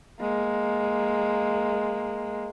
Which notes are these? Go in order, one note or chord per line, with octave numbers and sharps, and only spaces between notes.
G#3 A#3